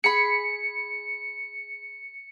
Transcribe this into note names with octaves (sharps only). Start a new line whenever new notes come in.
G#4 B5 C#7